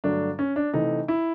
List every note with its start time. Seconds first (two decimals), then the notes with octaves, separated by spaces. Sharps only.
0.04 G2 D3 F#3 A3 D4
0.39 C#4
0.56 D4
0.74 C3 E3 A3 D#4
1.08 E4